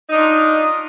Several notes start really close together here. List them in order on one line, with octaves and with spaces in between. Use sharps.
D#4 D4 F4